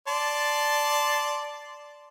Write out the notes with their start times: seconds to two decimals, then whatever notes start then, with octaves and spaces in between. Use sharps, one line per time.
0.08 D5 A5 C6